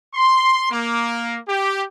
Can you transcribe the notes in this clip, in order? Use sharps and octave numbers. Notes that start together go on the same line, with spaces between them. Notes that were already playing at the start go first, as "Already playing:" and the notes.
C6
A#3
G4